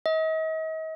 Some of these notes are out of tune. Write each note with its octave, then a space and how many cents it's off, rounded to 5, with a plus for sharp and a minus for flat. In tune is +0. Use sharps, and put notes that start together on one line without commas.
D#5 +40